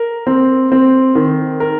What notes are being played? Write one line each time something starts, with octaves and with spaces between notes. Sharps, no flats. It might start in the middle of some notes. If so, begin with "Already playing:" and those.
Already playing: A#4
C4
C4
D#3
A#4